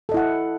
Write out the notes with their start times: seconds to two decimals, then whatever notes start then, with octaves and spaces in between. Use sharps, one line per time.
0.09 A4
0.12 D#5
0.14 E4
0.17 F#5